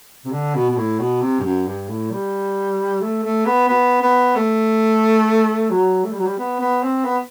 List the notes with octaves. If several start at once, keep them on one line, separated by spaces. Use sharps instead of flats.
C3
D3
B2
B2
A2
B2
C3
G2
F#2
G2
A2
G3
A3
A3
B3
B3
B3
A3
F#3
A3
G3
F#3
G3
B3
B3
C4
B3